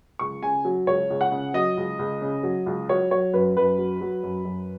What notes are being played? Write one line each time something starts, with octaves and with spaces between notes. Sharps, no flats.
C#2 C#6
C#3 G#5
F#3
C#2 C#5
C#2
F#5
C#3
F#3 D#5
C#2
C#2
C#3
F#3
C#2
F#3 C#5
F#3 C#5
F#2 B4
F#2 B4
F#3
F#3
F#2
F#2